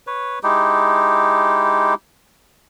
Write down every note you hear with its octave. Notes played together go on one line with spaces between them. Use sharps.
B4 C#5
G#3 D#4 E4 G4